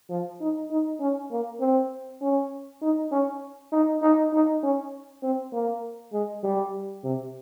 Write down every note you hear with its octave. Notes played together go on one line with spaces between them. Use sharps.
F3
D#4
D#4
C#4
A#3
C4
C#4
D#4
C#4
D#4
D#4
D#4
C#4
C4
A#3
G#3
G3
C3